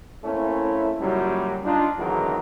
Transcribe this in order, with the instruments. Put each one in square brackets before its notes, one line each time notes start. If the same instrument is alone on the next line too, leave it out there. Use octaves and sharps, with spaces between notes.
[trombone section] A3 A#3 C4 C#4 E4
F#2 A#2 C#3 F#3 G3
D4 D#4 F4
G#1 E2 D3 D#3 F#3 A#4